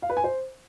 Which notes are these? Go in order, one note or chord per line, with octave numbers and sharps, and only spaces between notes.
F5
B4
G#5
C5